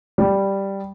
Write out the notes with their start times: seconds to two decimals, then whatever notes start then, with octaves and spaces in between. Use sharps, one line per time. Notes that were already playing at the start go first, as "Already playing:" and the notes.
0.18 G3